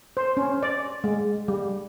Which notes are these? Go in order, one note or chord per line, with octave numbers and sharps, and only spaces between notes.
C5
C#4
D5
G#3
G3